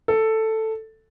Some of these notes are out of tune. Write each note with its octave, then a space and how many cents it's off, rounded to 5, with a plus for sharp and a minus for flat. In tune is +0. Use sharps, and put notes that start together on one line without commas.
A4 +5